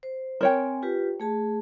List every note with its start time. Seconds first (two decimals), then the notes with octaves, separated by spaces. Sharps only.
0.03 C5
0.41 C4 A#4 C#5 G5 G#5
0.83 F4 G4 B4
1.20 A3 G#4 A5